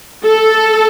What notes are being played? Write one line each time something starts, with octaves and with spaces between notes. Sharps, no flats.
A4